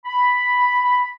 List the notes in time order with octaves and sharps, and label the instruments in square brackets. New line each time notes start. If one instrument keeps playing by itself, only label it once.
[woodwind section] B5